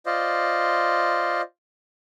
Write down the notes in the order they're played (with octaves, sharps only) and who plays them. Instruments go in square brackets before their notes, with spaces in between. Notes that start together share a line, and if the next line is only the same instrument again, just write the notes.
[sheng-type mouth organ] F4 C5 D5 D#5